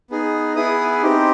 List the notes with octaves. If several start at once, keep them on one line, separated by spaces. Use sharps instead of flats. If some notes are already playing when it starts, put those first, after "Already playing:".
B3 D#4 G#4
B3 E4 G#4 D#6
C4 D#4 G4